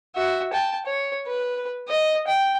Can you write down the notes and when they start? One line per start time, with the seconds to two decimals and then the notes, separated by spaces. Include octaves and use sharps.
0.15 F#4 E5
0.53 G5 A5
0.86 C#5
1.27 B4
1.88 D#5
2.27 G5